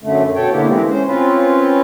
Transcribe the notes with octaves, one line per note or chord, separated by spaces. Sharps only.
F#2 D3 A3
B2 A4 C#5 G5
D3 A#3 B3 E4 G4
E3 G#3 C4
C#4 C5
C4 C#4 F4 B4